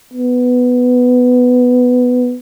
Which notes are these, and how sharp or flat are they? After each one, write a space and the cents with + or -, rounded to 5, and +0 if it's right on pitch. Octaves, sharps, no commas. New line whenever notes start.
B3 +5